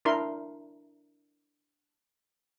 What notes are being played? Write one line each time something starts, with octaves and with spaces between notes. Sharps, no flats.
D4 E4 A#4 C6